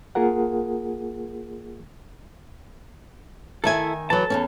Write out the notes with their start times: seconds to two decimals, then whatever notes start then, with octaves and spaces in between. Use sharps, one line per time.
0.15 A#3 F4 G#4 A#4 F#5
3.64 D#3 E4 A4 E5 G#5
4.10 E3 F#3 A4 A5
4.30 E2 G#2 C#4